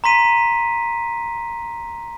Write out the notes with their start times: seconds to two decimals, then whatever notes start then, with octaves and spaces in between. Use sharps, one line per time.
0.04 A#5 C6 B6 D#7